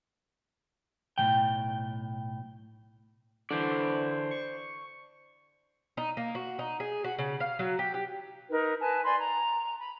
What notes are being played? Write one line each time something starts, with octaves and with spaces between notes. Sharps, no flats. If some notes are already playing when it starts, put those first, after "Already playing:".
B1 A2 C3 G5
D3 E3 C5 D5
C#6
D#4
A#3
F#4
D#4
G#4
F#4
C#3
F5
F#3
G4
G4
D#4 A#4 B4
B4 G#5 A5
D5 G#5 B5 C6
A#5
B5